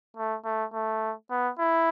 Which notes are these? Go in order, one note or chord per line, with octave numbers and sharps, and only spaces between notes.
A3
A3
A3
B3
E4